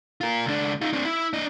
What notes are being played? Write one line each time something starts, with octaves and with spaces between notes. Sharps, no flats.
F4 A#4
C#2 D4
D#4 F4
C4 D4
E4
D4 D#5